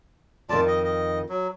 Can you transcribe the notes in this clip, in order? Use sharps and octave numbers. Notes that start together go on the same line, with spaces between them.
F2 D#3 F4 D5 A5
D#5
D#5
F#3